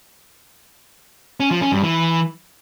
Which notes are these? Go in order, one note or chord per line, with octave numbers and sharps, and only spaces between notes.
C#4
F3
C#4
G2
E3